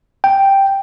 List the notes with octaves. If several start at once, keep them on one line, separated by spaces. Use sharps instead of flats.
G5